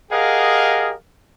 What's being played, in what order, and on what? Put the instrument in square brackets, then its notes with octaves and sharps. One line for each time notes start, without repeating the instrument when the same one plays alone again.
[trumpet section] G4 G#4 A#4 D#5 F5 F#5